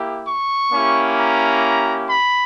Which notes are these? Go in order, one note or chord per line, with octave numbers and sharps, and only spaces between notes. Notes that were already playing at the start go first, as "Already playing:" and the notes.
Already playing: A#3 E4 G4
C#6
A#3 C#4 E4 G4
A#5
B5